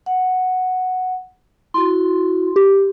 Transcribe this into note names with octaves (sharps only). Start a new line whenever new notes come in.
F#5
E4 F#4 C6
G4